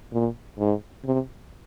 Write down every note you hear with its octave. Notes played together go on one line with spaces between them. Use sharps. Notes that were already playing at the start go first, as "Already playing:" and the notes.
A#2
G#2
C3